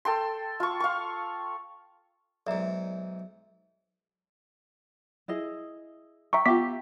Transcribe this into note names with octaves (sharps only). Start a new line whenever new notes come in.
A4 G5 C6
F4 C#6
F5 C#6
B1 G#2 D5 E5 A#5
E4 G#4 D#5
E5 G5 A#5 C#6
B3 F4 G4 E5 D6 B6